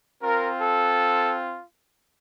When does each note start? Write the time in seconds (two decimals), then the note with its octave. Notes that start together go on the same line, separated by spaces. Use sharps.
0.22 C4 F4 A#4
0.58 A4